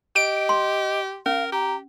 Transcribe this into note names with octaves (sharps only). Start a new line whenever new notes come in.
G4 D#5 D7
C6
C#4 A#4 F5
G4 A#5